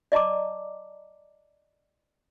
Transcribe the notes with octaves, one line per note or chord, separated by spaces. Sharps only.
D5 D#5 A5 A#5 D6